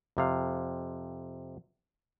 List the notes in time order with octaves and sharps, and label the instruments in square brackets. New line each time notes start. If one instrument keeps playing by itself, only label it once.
[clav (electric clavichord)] F2 C3 F5